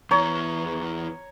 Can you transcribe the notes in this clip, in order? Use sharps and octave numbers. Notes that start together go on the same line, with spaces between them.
E2 E3 C#5 A#5